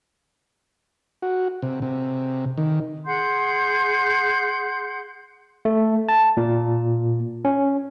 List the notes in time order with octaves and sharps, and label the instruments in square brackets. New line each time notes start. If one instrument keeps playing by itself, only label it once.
[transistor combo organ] F#4
C3
C3
D#3
[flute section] G#4 F#5 C6 G6
[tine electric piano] A3
A5
A#2
C#4